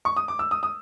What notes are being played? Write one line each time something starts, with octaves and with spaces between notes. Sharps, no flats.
C#6
D#6
D6
E6
D#6
D#6